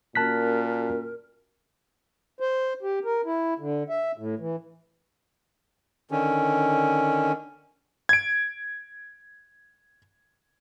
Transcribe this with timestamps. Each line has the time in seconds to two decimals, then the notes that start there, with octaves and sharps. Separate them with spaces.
0.15 A#2 A#3 C#4 F#4 A#4 A5 F#6 B6
2.40 C5
2.83 G4
3.05 A#4
3.26 E4
3.59 D3
3.89 E5
4.17 A2
4.39 E3
6.11 D3 D#3 C#4
8.09 G#6 D7